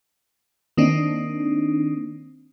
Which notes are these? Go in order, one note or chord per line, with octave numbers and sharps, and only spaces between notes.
D#3 A#3 C4 D4 D#4